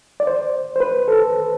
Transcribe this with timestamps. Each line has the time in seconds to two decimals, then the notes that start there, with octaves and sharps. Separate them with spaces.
0.20 D5
0.27 C5
0.76 C5
0.80 B4
1.08 A4